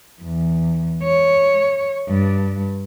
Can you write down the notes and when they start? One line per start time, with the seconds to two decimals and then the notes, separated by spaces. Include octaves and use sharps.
0.23 E2
1.04 C#5
2.09 G2